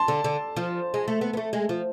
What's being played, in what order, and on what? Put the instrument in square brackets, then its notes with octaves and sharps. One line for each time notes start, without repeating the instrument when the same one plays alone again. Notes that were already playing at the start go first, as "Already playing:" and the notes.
Already playing: [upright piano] A5 C6
[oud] D3
D3
F3
G#3
A3
B3
B3
A3
G#3
F3